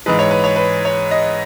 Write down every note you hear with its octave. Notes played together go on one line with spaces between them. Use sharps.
G#2 E3 G#3 B4
C#5
B4
C#5
B4
C#5
D#5